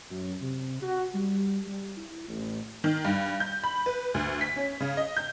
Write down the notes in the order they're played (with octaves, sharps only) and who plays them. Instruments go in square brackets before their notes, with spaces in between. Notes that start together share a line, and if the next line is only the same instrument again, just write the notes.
[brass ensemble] F#2
C3
F#4
G3
G3
E4
A1
[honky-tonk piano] D#3
G2
G6
B5
B4
D2
B6
C#4
C#3
D#5
G6